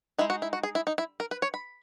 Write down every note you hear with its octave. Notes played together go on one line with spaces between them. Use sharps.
G#3 D#4 E4
F#4
E4
F#4
G#4
E4
D#4
E4
A#4
B4
C#5
B5